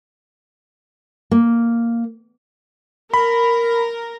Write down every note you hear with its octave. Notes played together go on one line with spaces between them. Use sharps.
A#3
A#4 B5